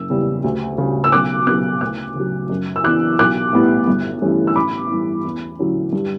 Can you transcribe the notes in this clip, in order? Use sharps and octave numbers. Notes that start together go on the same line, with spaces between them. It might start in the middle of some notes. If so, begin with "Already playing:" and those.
Already playing: F#1 E6
E2 C#3 G3
D2
C#3 G3
E6
B1 D6 F#6
B2 F#3 D6 F#6
D2 D6 F#6
C#3 F#3
F#2
E6
E3 B3 D4 D6 F#6
B1 D6 F#6
A2 G3 B3 E4
G1
G2 E3 A3 C#4
E6
A1 B5 D6
G2 E3 B3 E4
E2
D3 F#3 C#4 E4
G2